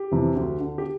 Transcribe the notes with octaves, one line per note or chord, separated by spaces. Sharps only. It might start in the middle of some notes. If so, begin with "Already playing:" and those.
Already playing: G4
F2 C3 E3
D2
D3
G4